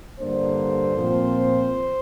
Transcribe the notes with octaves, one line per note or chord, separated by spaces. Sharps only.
G2 D3 A#3 D4 C5
A#2 F3 C4